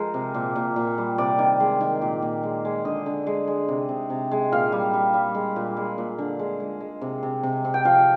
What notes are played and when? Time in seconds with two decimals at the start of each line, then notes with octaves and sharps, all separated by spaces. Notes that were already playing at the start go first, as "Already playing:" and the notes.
Already playing: F3 G#3 A#4 C5
0.14 C3
0.34 A#2
0.56 A#2
0.76 A#2
0.98 G3
1.18 C3 D5
1.39 D#3
1.60 G#3
1.81 D#3
2.02 A#2
2.22 A#2
2.43 G#3
2.65 G#3
2.85 D3 D#5
3.06 D3
3.27 G#3
3.48 G#3
3.69 C3
3.89 C3
4.10 C3
4.31 G#3
4.52 A#2 F5
4.72 G3
4.94 G3
5.14 G3
5.35 G#3
5.56 A#2
5.77 G#3
5.98 A#2
6.19 D3
6.39 G#3
6.60 G#3
6.80 G#3
7.02 C3
7.23 C3
7.43 C3
7.65 C3
7.74 G5
7.85 F3 F5